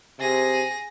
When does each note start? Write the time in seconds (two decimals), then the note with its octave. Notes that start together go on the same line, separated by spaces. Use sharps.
0.20 C3 G#4 A#6